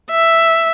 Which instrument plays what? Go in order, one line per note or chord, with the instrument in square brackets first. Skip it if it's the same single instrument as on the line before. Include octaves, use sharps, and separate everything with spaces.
[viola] E5